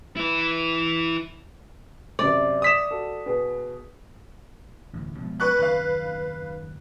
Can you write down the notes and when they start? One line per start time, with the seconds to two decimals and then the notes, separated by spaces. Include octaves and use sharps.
0.16 E4 B4
2.19 F#2 C3 D5
2.62 D#6 B6 E7
2.91 F#4 A4
3.26 B2 B3 G#4
4.93 A1 D2
5.18 B2 F3 G#3
5.40 B4 C#6 F#6
5.59 F#1 D#2 B4 F5